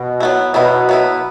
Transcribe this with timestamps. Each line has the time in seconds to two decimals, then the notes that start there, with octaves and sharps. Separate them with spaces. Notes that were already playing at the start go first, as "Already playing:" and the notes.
Already playing: B2
0.20 F#3 B3 E4
0.54 B2 F#3 B3 E4
0.89 F#3 B3 E4